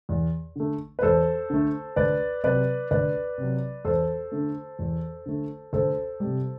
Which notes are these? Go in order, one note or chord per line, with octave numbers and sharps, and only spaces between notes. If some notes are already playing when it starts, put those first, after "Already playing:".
E2
D3 A3
B4
E2 A4 C5
D3 A3
D2 B4 D5
C3 F#3 B4 D5
D2 B4 D5
C3 F#3
E2 A4 C5
D3 A3
E2
D3 A3
D2 A4 C5
C3 G3